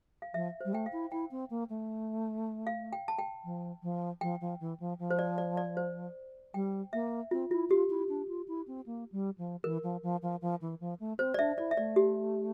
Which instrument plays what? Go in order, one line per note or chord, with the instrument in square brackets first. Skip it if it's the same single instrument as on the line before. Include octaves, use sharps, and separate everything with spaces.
[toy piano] F5
[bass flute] F3 [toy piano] E5
[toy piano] C5
[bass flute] G3
[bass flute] A3 [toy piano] G5
[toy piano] F5
[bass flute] E4
[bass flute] E4 [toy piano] G5
[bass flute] C4
A#3
A3
[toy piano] F5
G5
A5
G5
[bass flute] F3
F3
[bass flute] F3 [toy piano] G5
[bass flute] F3
E3
F3
F3
[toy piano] C5
D5
D5
D5
C5
[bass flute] G3 [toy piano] G5
[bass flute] A#3 [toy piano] E5
[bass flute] C4 [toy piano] F4
[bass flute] E4 [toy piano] F4
[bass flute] F4 [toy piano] G4
[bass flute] E4
D4
F4
E4
C4
A#3
G3
F3
[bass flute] E3 [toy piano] A#4
[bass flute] F3
F3
F3
F3
E3
F3
A3
[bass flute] C4 [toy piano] C5
[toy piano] D5
[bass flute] D4 [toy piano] E5
[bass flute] E4 [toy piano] D5
[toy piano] E5
[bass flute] A3 [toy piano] D5
[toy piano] G4